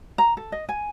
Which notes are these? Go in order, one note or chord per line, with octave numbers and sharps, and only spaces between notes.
A#5
A4
D#5
G#5